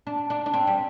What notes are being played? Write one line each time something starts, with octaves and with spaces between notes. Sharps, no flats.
D4
D4
D4
C4
G3